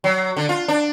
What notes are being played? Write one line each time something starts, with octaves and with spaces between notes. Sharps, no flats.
F#3
D3
F4
D4